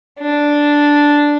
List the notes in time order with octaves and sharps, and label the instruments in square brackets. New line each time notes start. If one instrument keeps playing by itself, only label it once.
[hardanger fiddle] D4